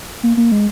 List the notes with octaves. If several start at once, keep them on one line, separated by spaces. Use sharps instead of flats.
A#3
A#3
G#3